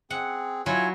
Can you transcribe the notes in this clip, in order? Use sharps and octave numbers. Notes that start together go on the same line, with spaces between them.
C4 G#4 F#5
F#3 E4 F4 G#5 C#6